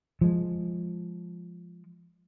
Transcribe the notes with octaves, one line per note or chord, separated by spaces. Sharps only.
F3 G#3